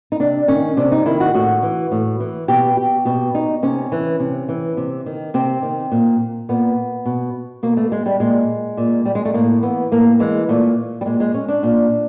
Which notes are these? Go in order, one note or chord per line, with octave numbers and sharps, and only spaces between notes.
D#4
C3 D4
D#3 C#4
C3 D4
D#4
D#3 E4
F#4
A2 F#4
E3
A2
E3
B2 G4
G4
B2 G4
D#4
C3 C#4
E3
C3
E3
C3
D#3
C3 C4
D#3
A#2
A#2 B3
B2
B2 A#3
A3
G#3
G3
A#2 G#3
A#2
G3
G#3
A3
A2 A#3
E3 B3
A2 A#3
E3 G#3
A#2 A3
G3
A#2 G#3
G#3
C#4
D4
A#2